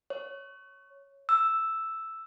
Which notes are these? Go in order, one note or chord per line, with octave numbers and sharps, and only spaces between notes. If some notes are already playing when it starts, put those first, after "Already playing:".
C#5
E6